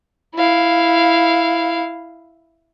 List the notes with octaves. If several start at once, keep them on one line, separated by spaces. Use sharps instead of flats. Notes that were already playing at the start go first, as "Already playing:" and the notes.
E4 F5